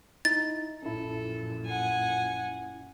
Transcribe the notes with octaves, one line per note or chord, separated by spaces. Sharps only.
D#4 E4 A6
A#1 F#2 A#2 C#4 E4 A4
F#5 G#5